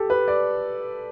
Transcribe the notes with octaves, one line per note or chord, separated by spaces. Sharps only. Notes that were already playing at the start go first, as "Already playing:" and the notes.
Already playing: G4 A4
B4
D5